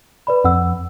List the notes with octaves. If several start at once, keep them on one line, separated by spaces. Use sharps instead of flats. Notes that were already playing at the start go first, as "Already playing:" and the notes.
B4 D5 B5
F2 F#5 E6